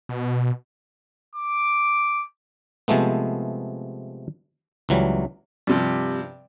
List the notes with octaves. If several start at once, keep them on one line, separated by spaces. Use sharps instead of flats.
B2
D6
C3 F3 G#3 A3 B3
C#2 E3 F#3 G3
G2 C3 F3